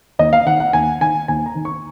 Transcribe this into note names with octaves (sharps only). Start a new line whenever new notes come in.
D#2 D#5
F5
D#3 F#5
F#5
D#2 G#5
D#3 G#5
D#2 G#5
A#5
D#3
C#6